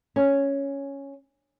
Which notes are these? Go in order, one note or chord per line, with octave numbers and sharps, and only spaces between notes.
C#4